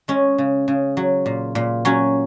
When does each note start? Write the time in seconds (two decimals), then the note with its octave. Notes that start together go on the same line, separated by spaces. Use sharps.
0.08 G#3 C#4
0.38 C#3
0.68 C#3
0.97 F#3
1.26 A#2
1.55 A#2
1.85 F#3 C#4